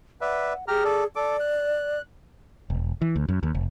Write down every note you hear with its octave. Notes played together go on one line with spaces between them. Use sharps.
B4 D5 E5 F#5
G4 G#4 A#5 F6
A4 D5
A4 D5 D6
F#6
E1
E3
D2
F#2
D#2
F1